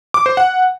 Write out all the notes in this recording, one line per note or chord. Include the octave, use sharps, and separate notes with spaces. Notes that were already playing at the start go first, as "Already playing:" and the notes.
D6
C5
F#5